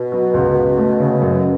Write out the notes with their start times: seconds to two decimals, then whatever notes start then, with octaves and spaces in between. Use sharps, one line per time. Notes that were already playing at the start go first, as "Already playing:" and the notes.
Already playing: B2
0.12 F#3
0.34 C#2
0.56 C#2
0.78 A3
1.00 C#3
1.21 F#2